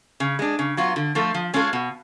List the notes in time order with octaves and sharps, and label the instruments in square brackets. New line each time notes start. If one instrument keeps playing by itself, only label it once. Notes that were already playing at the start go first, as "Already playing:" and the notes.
[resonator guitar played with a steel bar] C#3
G#3 D4
C#3
F#3 B3 F4
D3
F3 A3 F4 A4
F3
G#3 C#4 F4 A4
B2